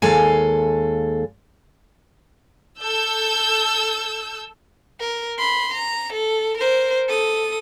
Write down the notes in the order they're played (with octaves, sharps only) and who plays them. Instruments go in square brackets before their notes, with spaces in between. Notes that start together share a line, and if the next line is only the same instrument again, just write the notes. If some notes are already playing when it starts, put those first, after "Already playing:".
[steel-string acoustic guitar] D#2 G#3 A4 F5 G#5
[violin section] A4 E6 G6
[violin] A#4
B5 C6
A#5
A4
A#4 C5
A4 D#6